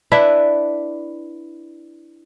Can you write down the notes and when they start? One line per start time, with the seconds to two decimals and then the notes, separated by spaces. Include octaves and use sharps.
0.12 D4 E4 B4 E5